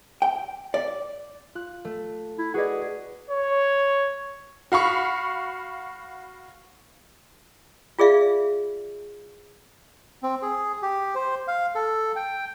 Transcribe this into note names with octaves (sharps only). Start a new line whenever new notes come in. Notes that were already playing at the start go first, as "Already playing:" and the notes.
G5
D5
F4 F#6
A3
E4
F#4 G#4 B4 D5 D#5 F#5
C#5
F#4 F5 B5 C#6
F4 G#4 D5 E5 F5
C4
G#4
G4
C5
F5
A4
G5